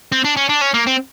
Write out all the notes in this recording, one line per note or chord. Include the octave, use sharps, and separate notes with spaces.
C4
D4
C#4
D4
C#4
A#3
C4